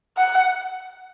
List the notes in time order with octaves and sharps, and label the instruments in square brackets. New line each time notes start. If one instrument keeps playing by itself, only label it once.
[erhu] F#5